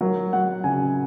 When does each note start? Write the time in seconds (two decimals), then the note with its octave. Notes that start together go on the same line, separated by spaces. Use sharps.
0.01 F#3 A#4
0.33 F#3 F#5
0.64 C#3 G#5